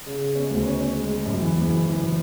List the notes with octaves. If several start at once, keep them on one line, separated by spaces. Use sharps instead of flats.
C#3
C#3
C#4
D2
C#4
C#4
G#3
G#3
F#2
E3
F#1
E3
E3
E3